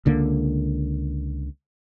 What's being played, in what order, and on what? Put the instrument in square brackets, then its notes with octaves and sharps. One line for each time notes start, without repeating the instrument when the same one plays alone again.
[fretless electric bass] C#2 D3 A#3